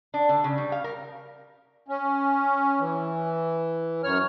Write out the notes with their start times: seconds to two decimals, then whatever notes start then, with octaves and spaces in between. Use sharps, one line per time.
0.14 D4
0.29 D3
0.44 C#3
0.58 G3
0.72 F5
0.84 A#4
1.88 C#4
2.80 E3
4.04 F#2 C#5 F6